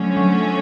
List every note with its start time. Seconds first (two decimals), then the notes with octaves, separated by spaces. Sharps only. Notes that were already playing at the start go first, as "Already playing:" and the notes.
Already playing: D3 F3 F#3 A3 C#4
0.17 F#3